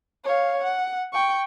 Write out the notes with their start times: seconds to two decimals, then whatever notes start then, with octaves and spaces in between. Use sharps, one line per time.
0.24 C#5 F5
0.64 F#5
1.13 G5 C#6